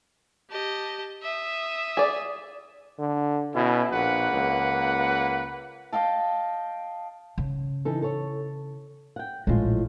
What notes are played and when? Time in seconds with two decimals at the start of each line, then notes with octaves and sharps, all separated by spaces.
0.50 G4 D#5 A5
1.22 E5 D#6
1.97 G#4 D5
2.99 D3
3.55 B2 C#4 E4
3.92 A#1 A#3 B4 F#5
4.32 C#2
5.92 D#5 F5 G5 A5
7.38 C#3
7.85 E3 D#4 A4
8.02 A4 C#5
9.16 F#5 G5
9.47 A#1 A2 F3 G#3 F4